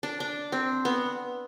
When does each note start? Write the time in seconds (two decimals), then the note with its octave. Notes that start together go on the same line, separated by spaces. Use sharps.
0.03 D4
0.20 D4
0.52 C4
0.85 B3